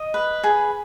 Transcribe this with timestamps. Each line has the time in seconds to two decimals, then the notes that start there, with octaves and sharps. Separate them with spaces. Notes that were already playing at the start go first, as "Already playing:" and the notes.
Already playing: D#5
0.14 B4
0.44 G#4